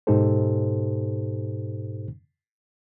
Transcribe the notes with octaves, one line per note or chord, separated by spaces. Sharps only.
G#2 B2 D#4 G4 A4 C5